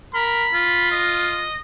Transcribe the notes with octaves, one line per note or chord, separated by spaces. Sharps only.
A#4 B5
F4
D#5